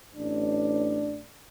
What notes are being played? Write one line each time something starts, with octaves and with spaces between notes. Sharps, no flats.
A1 D4